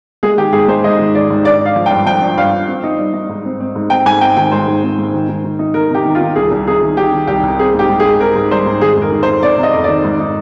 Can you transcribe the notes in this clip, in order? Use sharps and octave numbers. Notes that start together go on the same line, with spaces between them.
G#3 G#4
D#3 G4
G#2 G#4
G#3 C5
G#2 D#5
D#3
D#3 D5
G#2
D4 D5
D4 F5
F3
G5
G2
F3 G5
D4
G2 F5
D4
C4
D#4
G3
D#4
G#2
C4
C4
G#2
C4 G5
G#2 G#5
C4 G5
D#3 G5
G#2 C5
G#2
C4
G#2
D#3
D#3
D#3
D#4
D#3 A#4
C3 G4
D#3
F4
D#3
C2 G#4
C2
C3 G#4
D#3
D#3 G4
D#3
C2 G4
C2
C4 G#4
G#2 G4
G#2
G#4
G#2
C4 A#4
G#2
G3 C5
G#2
D#3 G#4
F2
A#4
D#3
C5
F2
C3 D5
C3
D#5
F2
D#3 D5
G#2
D#4